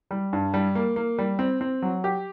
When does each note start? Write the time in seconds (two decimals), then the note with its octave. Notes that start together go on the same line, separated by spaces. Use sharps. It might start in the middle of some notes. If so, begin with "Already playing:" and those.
0.11 G3
0.33 G2
0.54 G3
0.75 A#3
0.96 A#3
1.19 G3
1.39 C4
1.61 C4
1.82 F#3
2.04 G4